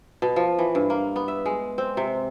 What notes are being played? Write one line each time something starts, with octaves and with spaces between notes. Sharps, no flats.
B2
F3
E3
G2
A#3
B3
E5
G#3
C4
C3